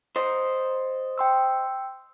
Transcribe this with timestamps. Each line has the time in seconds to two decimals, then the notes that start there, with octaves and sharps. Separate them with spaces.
0.16 C5 D#5
1.18 G5 C6 E6